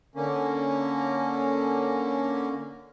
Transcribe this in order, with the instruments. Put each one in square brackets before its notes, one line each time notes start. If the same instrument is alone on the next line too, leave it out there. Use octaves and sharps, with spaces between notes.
[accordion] D3 A#3 C#4